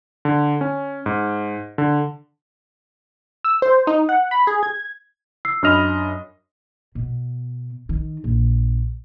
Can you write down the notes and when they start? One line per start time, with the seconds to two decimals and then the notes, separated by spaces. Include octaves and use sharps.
0.25 D3
0.61 C#4
1.06 G#2
1.78 D3
3.45 E6
3.62 C5
3.87 D#4
4.09 F#5
4.31 B5
4.47 G#4
4.63 G#6
5.45 E6 C7
5.63 F#2 D4 D#5 B5 F6 F7
6.95 B2
7.89 D#3
8.24 A#1